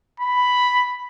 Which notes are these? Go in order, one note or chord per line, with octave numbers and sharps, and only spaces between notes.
B5